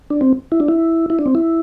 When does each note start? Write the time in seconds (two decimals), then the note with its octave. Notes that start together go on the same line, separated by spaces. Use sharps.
0.10 D4
0.21 C4
0.52 E4
0.60 D4
0.68 E4
1.10 E4
1.19 D4
1.26 C4
1.35 E4